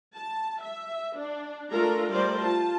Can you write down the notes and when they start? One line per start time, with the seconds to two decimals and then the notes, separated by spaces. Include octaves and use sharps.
0.15 A5
0.61 E5
1.17 D4
1.71 A3 D4 F4 A4 A#4 A#5
2.10 G3 A3 A#4 C5 D5
2.40 F4 A5